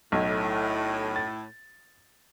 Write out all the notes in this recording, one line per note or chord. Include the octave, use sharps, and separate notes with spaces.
B1 A2
A6